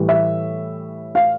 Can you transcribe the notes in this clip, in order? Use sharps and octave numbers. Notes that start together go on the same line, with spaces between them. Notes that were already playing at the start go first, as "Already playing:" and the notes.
Already playing: A2 E3 G3
E5
F5